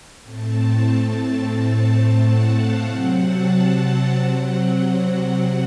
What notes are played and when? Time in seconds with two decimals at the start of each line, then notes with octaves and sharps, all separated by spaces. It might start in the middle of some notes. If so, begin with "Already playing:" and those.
0.23 A2 A3 C4 A5
1.54 A2 A3 C4
2.20 F#5
2.53 F5
2.84 C3 F#3 C4 F#5
3.18 A5
3.51 F#5
4.15 C3 F#3 C4 F#5